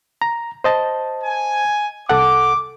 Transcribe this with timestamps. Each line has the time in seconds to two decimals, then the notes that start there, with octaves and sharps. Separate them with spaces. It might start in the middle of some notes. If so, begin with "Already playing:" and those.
0.22 A#5
0.64 C5 D#5 A5
1.24 G#5
2.09 C2 A4 F#5 D6